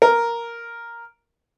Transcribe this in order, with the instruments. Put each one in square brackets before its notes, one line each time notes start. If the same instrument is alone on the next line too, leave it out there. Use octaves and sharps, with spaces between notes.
[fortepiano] A#4